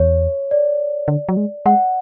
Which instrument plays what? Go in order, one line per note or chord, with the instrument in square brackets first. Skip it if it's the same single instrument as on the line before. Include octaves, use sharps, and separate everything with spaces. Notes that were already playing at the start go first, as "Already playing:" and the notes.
Already playing: [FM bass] E2 [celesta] C#5
[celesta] D5
[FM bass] D3
F#3
G#3
[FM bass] G#3 [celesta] F#5